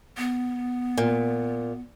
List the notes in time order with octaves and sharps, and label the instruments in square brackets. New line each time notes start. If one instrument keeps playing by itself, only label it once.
[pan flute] B3
[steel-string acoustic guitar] A#2